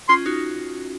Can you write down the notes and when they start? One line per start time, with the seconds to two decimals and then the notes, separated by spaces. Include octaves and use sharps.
0.09 C#4 F4 C6
0.26 D#4 F#4